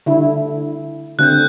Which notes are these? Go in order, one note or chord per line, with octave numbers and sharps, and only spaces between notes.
D3 E4
D3 C4 F#6 G6